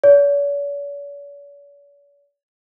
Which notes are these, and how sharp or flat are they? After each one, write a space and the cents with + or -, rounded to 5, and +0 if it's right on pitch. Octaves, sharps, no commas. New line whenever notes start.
C#5 +45